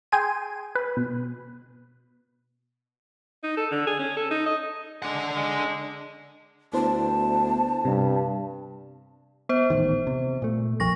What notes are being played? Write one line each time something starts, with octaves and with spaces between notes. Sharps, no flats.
G#4 G5 G#5 C6 D#7
B4
B2
D#4
A4
D3
G#4
C#4
A4
D#4
D#5
G#3 D4 F#5
G#3
D2 B3 E4 C5 A5
G2 C3
B3 C5
D#1 A1 D#3
C3
A#2 A3
B1 F2 F3 C#6 A#6